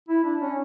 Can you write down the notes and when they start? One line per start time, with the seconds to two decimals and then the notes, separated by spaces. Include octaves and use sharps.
0.09 E4
0.24 D4
0.41 C#4